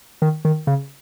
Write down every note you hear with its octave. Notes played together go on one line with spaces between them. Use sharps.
D#3
D#3
C#3